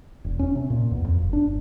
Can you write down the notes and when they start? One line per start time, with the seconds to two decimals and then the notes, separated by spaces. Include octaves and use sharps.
0.24 E1
0.39 C#4
0.55 C3
0.70 A#2
0.91 E2
1.05 F2
1.21 F#1
1.33 D4
1.46 G1